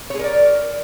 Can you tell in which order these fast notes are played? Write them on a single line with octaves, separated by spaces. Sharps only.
C#5 G#4 A#4 D5